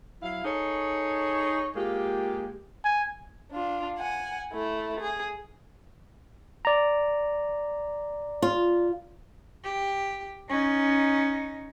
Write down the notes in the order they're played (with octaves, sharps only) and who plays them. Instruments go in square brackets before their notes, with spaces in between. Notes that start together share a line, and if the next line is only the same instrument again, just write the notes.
[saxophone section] F#3 E4 F5
D#4 G#4 A4 C#5
G#3 A#3 F4 G4
[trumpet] G#5
[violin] D4 F4
F#5 G#5
A3 E4
G#4
[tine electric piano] D5 A#5
[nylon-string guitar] F4
[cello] G4
C#4 D#4